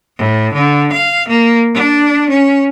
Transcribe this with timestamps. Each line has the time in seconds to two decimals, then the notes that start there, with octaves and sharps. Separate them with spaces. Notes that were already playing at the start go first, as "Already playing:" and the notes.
0.18 A2
0.53 D3
0.92 F5
1.28 A#3
1.74 D4
2.29 C#4